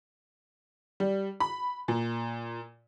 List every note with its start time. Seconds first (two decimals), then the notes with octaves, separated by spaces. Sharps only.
1.00 G3
1.40 B5
1.88 A#2